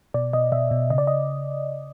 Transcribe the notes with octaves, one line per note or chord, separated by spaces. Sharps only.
B2 D5
B2 D#5
B2 E5
B2
C#3 D#5
D5
D#5